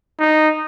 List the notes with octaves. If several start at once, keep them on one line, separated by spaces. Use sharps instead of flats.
D#4